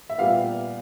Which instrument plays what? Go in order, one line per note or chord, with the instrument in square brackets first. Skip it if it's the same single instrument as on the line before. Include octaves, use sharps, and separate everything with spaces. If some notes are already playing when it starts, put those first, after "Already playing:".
[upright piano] E5
A#2 G3 B3 F5